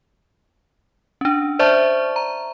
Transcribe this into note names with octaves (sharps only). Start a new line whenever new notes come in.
C#4 D4
C5 D5 E5 A5 C#6
A#5